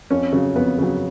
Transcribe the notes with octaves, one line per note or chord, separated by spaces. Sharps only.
F2 C#4
C#3 F#3
F2 B3
C#3 F#3